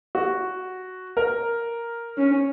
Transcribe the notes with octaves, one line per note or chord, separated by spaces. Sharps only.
F#4
A#4
C#4